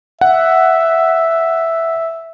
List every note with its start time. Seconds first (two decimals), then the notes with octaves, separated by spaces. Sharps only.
0.21 E5 F#5